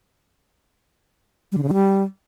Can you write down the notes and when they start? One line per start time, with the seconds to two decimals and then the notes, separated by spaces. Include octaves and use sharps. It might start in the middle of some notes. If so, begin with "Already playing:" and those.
1.52 G3
1.57 D3
1.63 C#3
1.68 D3
1.74 G3